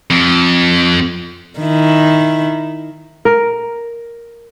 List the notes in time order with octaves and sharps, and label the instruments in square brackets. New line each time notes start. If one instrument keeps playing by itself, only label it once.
[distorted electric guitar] F2
[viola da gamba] D#3 E4
[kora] A#4